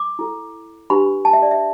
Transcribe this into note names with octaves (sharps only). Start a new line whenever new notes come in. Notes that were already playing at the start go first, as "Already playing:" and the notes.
Already playing: D6
E4 A4
D4 G4 B4 B5
A5
E5
D5
E5